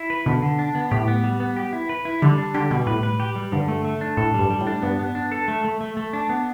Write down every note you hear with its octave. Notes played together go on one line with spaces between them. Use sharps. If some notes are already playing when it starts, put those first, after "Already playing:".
Already playing: E4
B4
B2 D3
D3
D4
B3
A2 G4
B3
G3
B3
G4
E4
B4
E4
D3 G3
D4
D3 G4
B2 G3
A2 B4
B4
G4
G3
G2 D3
A3
A3
D4
A2 A4
G3
G2
G3
A2
D4
G2 B3
B3
D4
A4
A3
A3
A3
A3
D4
B3